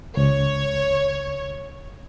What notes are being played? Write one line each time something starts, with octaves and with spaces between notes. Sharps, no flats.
C#2 C#5